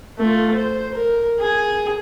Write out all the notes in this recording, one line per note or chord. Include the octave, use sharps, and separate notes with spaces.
A3 F4
C5
A#4
G#4